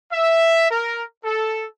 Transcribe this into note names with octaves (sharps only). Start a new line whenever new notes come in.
E5
A#4
A4